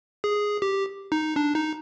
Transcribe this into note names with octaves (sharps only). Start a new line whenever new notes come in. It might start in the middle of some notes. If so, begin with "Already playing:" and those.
G#4
G4
D#4
D4
D#4